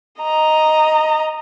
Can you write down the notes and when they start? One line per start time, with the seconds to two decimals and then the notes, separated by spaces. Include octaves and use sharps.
0.22 D#5 A#5